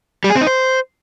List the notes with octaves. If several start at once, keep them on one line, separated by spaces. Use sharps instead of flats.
G3
G#4
C4
D#4
C5